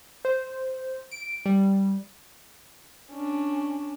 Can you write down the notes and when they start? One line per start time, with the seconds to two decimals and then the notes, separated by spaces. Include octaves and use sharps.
0.25 C5
1.11 D7
1.46 G3
3.13 C#4 D4